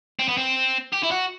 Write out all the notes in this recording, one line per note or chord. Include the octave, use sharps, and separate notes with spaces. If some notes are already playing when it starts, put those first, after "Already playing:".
C4
B3
C4
G4
E4
F#4